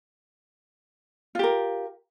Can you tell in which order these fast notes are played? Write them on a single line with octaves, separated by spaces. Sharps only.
F4 G4 A#4